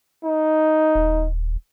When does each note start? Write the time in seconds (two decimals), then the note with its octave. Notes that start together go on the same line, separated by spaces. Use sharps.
0.25 D#4
0.95 D#1